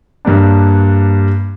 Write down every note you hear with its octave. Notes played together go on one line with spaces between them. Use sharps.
G2 A#3 D4